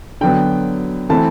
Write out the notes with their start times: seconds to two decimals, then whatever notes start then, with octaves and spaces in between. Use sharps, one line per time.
0.21 D3 F#3 B3 G5
1.09 E3 A3 C4 E4 A5